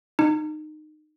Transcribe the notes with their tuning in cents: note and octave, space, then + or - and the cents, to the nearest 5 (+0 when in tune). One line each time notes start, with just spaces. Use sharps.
D#4 -20